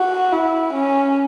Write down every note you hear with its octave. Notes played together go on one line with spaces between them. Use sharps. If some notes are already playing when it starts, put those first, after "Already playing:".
Already playing: F#4
E4
C#4